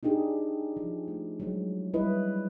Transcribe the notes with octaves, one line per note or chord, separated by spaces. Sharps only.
D4 D#4 G4 G#4
F3
A3
F#3 G#3
G3 E4 B4 D#5